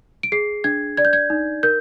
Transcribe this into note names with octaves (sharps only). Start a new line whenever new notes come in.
D7
G#4 C7
D4 G#6
D5 G#6
G6
G#6
D#4
A#4 G6